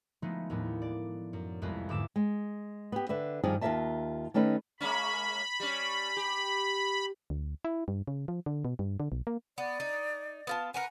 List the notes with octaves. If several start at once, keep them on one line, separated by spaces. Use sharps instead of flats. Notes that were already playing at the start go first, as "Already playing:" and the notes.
F3 G#3 A3 B3 D#4
D#2 A2 F3 B3
D5
F#2
C2 F2 G#3 A#3 B4
E2 G#2 D3 D6 E6 E7
G#3
B3 G4
D3 B4 E5
G2 D#3 F3 G#4
D#2 F4 A4 A#4 E5 A5
D#3 A3 C#4 D#4 B4
G#3 A#3 C#4 B5
G3 C#4
G4
D2
E4
G2
C#3
F3
D3
B2
G2
D3
B1
A#3
B3 D5
D#4
B3 F4 A5
A#4 B4 F#5 G#5